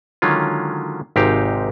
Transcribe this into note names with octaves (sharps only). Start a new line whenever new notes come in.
D3 D#3 F#3 G#3 C#4 F4
G#1 G#2 C3 D#4 G4 F5